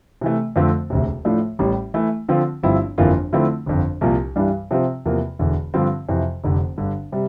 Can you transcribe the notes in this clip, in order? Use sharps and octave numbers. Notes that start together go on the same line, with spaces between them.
C3 E3 A3
F2 D3 F3 A3 C4
E1 D2 C3
A2 F3 A3 D4
A1 A2 G3
E3 A3 E4
D3 F3 C4 F4
G1 G2 F3 C4 E4
G1 F2 E3 A#3 F4
D3 F3 A3 C4 E4
G1 F2 D3
C2 A#2 F3
G2 E3 G3 D4
C3 F3 C4
E2 C3 F3 A#3
E1 E2 D3
G2 D3 F3 C4
F2 C3 E3
F1 F2 D3
G1 G2 D3
C3 G3